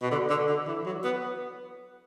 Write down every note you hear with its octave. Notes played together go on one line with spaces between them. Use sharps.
B2
D3
D3
D3
E3
F#3
B3